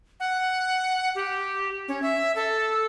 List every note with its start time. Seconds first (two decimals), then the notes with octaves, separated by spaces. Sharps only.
0.20 F#5
1.15 G4
1.88 C#4
2.02 E5
2.36 A4